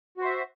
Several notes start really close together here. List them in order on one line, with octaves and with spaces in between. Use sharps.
F#4 C5 E5